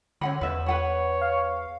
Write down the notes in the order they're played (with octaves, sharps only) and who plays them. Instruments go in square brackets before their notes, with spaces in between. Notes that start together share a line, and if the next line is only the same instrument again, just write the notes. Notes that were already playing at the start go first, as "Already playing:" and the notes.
[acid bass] D3 [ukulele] C#4 F#5 B5
[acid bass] E2 [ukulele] B4 E5
[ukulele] B4 F#5 B5 [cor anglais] C#5
[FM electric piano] F5